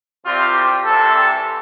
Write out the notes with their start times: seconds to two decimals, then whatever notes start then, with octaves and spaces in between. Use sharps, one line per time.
0.23 C2 C3 G3 C4 F4
0.54 G4
0.84 C2 C3 E3 G3 A4